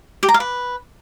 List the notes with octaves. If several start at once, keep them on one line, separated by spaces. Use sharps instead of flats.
G4
A#5
F5
B4